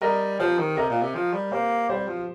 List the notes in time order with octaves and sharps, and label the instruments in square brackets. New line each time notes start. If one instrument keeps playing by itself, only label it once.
[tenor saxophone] G3 [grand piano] A#4 D#5
[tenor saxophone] F3 [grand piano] G4 C5
[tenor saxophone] D#3
[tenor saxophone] C3 [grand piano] A#4 D#5
[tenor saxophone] A#2
C3
F3
G3
[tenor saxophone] A#3 [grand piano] G4 C5
[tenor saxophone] G3 [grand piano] G4 C5
[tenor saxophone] F3